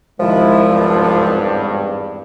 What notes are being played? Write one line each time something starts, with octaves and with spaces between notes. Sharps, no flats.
C2 D#3 F3 G#3 E4
G#1 E2 G2